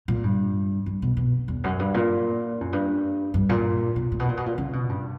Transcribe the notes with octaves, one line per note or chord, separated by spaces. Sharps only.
A#2
G2
G2
B2
B2
E2
F#2
G2
A#2
F#2
G2
G2
A#2
B2
A#2
B2
A#2
B2
A#2
C#3
B2
G2